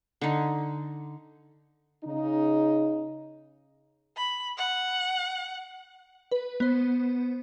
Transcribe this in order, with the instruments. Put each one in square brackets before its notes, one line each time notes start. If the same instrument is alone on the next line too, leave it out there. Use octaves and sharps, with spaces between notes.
[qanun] D3 D#4
[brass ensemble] C#3 D#4
[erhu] B5
F#5
[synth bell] B4
B3 C5